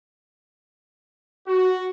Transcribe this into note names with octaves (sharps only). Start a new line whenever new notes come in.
F#4